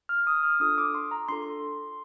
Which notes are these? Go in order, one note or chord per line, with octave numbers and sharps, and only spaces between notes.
F6
D#6
F6
D4 F4 A4 D#6
D6
C6
A#5
D4 F4 A4 C6